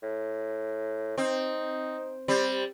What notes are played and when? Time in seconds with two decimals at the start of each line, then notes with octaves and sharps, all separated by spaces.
0.03 A2
1.18 C4 D#4
2.28 G3 C4